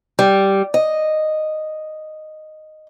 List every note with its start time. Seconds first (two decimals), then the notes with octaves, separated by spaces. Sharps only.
0.19 G3
0.74 D#5